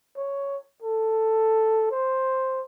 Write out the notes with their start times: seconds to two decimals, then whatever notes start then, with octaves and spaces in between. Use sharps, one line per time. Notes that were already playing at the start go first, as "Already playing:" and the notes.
0.17 C#5
0.82 A4
1.91 C5